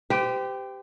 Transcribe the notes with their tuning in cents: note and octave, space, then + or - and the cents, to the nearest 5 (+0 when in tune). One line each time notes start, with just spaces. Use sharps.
G4 +0 C5 -40